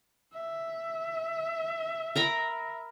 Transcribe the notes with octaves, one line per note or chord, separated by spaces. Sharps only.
E5
A#4 A#5 B5